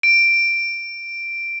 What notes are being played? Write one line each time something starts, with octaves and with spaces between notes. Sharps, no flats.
D7